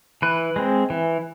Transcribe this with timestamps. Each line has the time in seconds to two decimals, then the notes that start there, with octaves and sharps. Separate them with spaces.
0.22 E3 B4
0.56 G#3 C4
0.90 E3